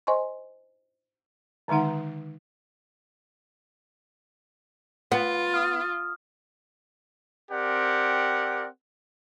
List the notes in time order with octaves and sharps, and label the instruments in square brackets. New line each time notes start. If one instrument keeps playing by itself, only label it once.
[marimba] C5 D#5 G#5 C6 C#6
[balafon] D3 D#3 G#3 D#4 F#5
[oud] B3 [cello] F4
[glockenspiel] D#6 F6
[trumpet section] C4 G4 A#4 D5 F#5